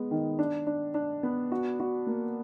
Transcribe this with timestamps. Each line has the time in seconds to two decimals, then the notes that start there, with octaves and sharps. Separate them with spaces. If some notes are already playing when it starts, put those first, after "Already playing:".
Already playing: G#3 B3
0.11 D#3
0.39 D4
0.67 D4
0.94 D4
1.23 B3
1.52 F#4
1.80 F#4
2.07 A#3